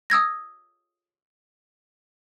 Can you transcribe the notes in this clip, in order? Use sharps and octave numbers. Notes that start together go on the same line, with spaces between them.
D#6 E6 G#6 A#6